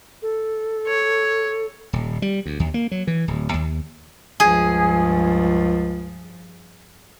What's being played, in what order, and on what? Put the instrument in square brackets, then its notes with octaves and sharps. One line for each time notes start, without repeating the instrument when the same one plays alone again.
[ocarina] A4
[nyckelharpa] C#5
[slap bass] D#1
G3
D2
D#2
A#3
F#3
E3
D1
D#2
[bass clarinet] C#2 [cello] G2 F3 [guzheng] G#4